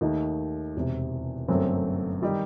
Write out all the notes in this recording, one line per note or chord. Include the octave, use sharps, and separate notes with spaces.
D#2 D#3 A3 D#4
E1 E2 C3
G1 F#2 F#3 A3 C4
D#3 G3 D#4 G4